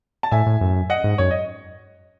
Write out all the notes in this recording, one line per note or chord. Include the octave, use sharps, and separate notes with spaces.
A5
A2 E5 G#5
A2
F#2
D#5 F#5
G#2
F#2 C#5
D#5